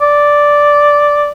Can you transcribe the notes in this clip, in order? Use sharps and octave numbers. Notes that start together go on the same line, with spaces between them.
D5